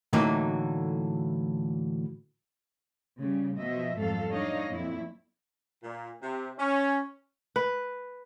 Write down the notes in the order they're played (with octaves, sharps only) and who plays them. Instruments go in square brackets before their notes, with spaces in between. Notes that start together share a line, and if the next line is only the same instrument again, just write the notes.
[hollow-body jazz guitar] A2 D3 E3 F#3 A#3 D#4
[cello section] C#3 G3
B2 F3 D#5 E5
F2 G#2 F#3 G3 A4 F5
F#3 D4 D#4 C#5 D#5 F5
F2 A#2 E4
[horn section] A#2
C3
C#4
[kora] B4